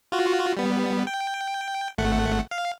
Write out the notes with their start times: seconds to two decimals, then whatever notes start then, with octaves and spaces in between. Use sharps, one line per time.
0.12 F4 F#4
0.57 G3 B3
1.07 G5
1.98 G#1 A3 F#5
2.51 F5